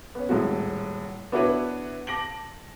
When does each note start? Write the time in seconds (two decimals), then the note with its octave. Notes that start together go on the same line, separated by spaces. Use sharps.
0.15 B3 C#4
0.29 D#1 A2 G#3 F#4
1.32 B3 D4 E4 F#4 B4 C#5
2.07 A5 D6 A#6 D7 F#7